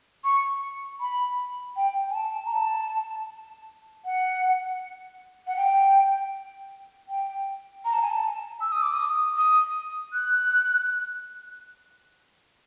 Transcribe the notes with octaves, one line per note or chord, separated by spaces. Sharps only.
C#6
B5
G5
G#5
A5
A#5
A5
F#5
F#5
G5
G5
A#5
A5
G#5
A5
E6
D#6
D6
D#6
D#6
F#6